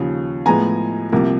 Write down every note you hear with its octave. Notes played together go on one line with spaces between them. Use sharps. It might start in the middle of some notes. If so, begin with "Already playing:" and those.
Already playing: D#2 C#3 F3
A2 F3 G#3 B3 G#5 A#5
C2 C3 F3 A#3